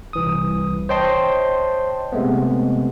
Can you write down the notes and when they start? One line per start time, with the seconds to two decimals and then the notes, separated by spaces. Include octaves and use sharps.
0.13 C2 E3 D#6
0.89 C5 C#5 D#5 G5 A5 C6
2.12 C3 G#3 A3 B3